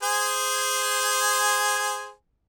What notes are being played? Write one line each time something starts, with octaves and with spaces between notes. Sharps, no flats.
G#4 C5 G#5